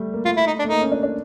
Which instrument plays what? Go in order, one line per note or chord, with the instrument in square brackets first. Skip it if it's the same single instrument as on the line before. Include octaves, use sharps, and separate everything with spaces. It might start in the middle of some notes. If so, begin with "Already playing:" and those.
Already playing: [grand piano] G3 A3
A#3
[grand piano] A3 [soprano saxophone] F4
[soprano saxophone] E4
D#4
D4
[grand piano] A3
[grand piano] A#3 [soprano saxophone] D#4
[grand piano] C#4
D4
D4